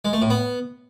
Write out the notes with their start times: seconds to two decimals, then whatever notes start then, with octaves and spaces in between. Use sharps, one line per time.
0.05 G#3
0.13 A3
0.22 A2
0.30 B3